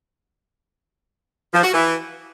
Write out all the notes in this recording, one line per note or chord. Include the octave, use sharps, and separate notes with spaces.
F3
F#4
E3